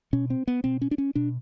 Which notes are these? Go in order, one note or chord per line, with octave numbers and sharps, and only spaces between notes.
B2 C#4
C4
B3
B2 C4
C#4
D4
C#4
B2 D4